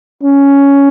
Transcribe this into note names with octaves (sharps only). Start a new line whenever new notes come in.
C#4